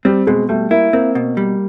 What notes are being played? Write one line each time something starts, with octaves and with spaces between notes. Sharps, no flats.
G3 C4
B2 G#3
G3 A3
A#3 E4
A#3 C4
B2
G3